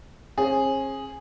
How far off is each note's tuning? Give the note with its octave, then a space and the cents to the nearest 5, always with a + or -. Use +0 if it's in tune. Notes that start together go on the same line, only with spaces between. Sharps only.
C#4 -45 G#4 +0